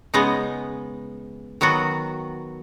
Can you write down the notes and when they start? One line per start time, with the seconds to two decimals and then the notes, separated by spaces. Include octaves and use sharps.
0.14 C#3 G#3 B3 D#4
1.61 D#3 F#3 B3 F#4